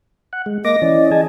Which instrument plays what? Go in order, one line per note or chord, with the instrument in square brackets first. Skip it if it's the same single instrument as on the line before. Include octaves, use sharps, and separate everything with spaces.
[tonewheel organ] F#5
G#3
[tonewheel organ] A#3 D6 A#6 [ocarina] D#5
[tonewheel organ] E3 C#4 D5
G#4 G#5 A5